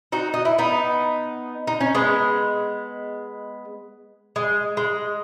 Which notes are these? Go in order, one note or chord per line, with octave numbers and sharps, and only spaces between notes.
D#4 F#4
D#4
E4
B3 D#4
D#4
C#4
G#3 B3
G#3
G#3